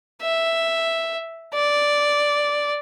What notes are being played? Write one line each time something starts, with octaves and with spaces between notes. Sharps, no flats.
E5
D5